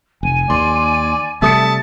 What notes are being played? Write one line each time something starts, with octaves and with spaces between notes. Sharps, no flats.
F1 G#5
D#2 D5 C6
C3 G3 A3 E5 A5 D#6 C#7